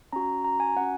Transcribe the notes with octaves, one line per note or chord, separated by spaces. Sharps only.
C#4 F#4 A#5
A#5
G#5
C#4 F#4 F#5